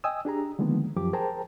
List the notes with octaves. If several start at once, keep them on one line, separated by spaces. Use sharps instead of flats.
D#5 G5 G#5 D#6 E6
D4 G4 G#4 A#5
D3 D#3 F3 G#3 A#3 B3
F#2 F3 G4 D6
G#4 A#4 C5 G5 A5 A#5